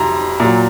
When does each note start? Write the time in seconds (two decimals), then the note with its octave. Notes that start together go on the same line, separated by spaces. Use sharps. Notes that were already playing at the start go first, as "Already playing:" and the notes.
Already playing: F2 C3 F#3 A#5 C6
0.40 A#2 F#3